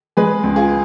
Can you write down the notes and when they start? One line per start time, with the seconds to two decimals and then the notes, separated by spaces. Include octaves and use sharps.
0.17 G#3 G#4 B4
0.43 C#2
0.56 F4 G#4